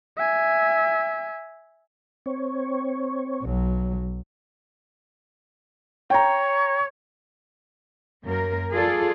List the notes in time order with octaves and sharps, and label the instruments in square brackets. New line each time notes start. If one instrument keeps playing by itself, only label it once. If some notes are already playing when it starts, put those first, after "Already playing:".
[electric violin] E5 G#5
[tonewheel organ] C4 C#5
[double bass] B1 F#3
[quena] C#5 [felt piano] G5 A#5
[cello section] F#2 A#3 A#4
F4 G#4 A4 D5